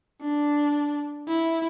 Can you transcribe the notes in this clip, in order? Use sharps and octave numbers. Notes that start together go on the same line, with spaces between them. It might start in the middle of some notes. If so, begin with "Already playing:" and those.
D4
E4